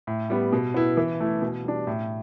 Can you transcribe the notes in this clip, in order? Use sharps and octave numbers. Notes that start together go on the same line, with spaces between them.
A2
G3 B3
B2
B3 E4
E3
A3 E4
B2
G3 D4
A2